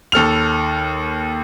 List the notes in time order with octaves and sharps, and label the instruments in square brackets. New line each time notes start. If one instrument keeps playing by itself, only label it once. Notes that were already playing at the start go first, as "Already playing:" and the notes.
[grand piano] D#2 A4 F6 F7